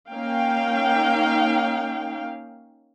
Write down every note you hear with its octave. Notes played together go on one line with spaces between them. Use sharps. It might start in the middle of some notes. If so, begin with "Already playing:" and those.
A#3 C#4 D#4 F5 G5